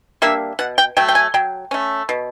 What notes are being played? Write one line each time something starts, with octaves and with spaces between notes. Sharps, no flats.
G3 A#3 D4 E5
B2 F#5
G5
F#3 A3 G5
G5
G#5
F#3 G5
A3 C#4
B2